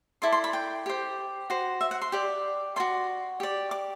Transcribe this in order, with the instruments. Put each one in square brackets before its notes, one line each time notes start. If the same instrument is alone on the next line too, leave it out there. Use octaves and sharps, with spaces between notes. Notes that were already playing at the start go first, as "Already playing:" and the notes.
[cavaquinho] E4 A4 D5 C6
C6
B5
G5
G4 C5
F#4 C5
E5
F#5
C6
G4 D5
F#4 A4 D5 C6
G4 D5
D6